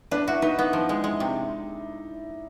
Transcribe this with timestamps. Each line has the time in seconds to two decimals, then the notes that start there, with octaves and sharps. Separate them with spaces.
0.11 D4 B4
0.27 E4 F#4
0.42 D#4 B4
0.59 B3
0.73 F3
0.89 G#3
1.04 G#3
1.20 C3